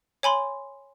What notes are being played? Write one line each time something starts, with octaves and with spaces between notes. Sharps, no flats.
C#5 G#5 B5 C6